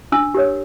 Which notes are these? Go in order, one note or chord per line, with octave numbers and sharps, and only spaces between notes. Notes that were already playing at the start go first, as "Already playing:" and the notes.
D4 E6
G4 A#4 C#5